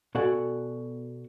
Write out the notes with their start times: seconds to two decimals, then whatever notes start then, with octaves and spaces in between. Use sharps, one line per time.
0.15 B2 F#4 A4 D5 F#5 G#5